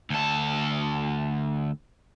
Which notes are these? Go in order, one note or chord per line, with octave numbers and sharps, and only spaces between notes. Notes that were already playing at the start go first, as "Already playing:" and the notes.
D2 A4